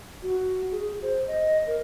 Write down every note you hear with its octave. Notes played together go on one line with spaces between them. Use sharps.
F#4
G#4
C5
D#5
A#4